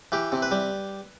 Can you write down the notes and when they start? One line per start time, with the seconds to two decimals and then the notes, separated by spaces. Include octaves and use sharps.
0.12 E3 G4
0.32 C3
0.42 B4
0.51 G3